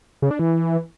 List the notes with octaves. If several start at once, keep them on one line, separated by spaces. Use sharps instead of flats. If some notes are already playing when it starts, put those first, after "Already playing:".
C#3
D4
E3